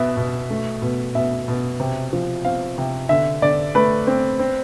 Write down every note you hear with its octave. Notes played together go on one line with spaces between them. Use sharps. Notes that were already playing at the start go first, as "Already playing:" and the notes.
Already playing: B2 B3 E5
B2
A3
B2
B2 E5
B2
C3
F3
C4 F5
C3
D3 E5
D3 D5
A3 B4
C4
C4